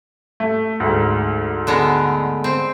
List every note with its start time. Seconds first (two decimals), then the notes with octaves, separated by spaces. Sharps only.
0.40 A3
0.80 D2 G#2
1.67 D3 G#3 B3
2.44 C4